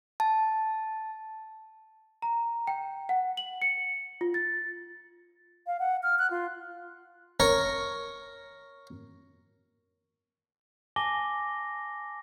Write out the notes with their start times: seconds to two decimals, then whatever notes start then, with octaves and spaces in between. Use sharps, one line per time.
0.20 A5
2.22 A#5
2.67 G5
3.09 F#5
3.37 F#7
3.62 C#7
4.21 F4
4.34 A6
5.67 F5
5.80 F#5
6.03 F6
6.19 F#6
6.30 F4
7.40 A#4 C#5 A#5 C#6
10.96 G#5 A5 D6 A#6 G7